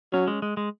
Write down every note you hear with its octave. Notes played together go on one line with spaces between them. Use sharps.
F#3 C#4
G#3
G#3
G#3